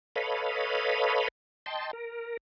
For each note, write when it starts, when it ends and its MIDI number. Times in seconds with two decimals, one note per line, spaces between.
0.16 1.28 69
0.16 1.28 71
0.16 1.28 73
0.16 1.28 75
0.16 1.28 77
0.16 1.28 83
1.66 1.91 75
1.66 1.91 79
1.66 1.91 81
1.66 1.91 84
1.93 2.37 70